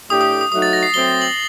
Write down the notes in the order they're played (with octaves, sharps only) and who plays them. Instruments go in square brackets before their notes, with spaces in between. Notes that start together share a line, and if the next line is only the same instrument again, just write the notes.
[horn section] A2 A3 D4 G4 [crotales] D#6
[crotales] D#6
D#6
[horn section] F#3 A3 D#4 F#4 [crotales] D#6
[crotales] A6
A#6
C7
[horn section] F#3 A3 C4 [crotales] G7
[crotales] F#7